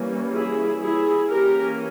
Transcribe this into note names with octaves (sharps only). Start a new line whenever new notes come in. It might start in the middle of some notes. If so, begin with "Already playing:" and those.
Already playing: E3 G3 A#3 C#4
E4 G#4
E4 G#4
E3 A#3 C#4 G4 A#4